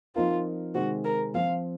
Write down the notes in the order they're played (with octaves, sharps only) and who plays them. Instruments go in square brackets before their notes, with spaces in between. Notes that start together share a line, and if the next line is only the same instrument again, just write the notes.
[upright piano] F3 C4 D#4 A#4 F5 [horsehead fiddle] F4
[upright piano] C3 D#3 G#3 C4 [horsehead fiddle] F#4
[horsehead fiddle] A#4
[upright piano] F3 C4 F4 [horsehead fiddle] F5